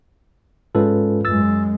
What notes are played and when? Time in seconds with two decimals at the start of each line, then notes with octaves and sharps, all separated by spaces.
0.75 G#2 G#3 C#4 F4 A4 B4
1.25 F#2 G#3 E6 A6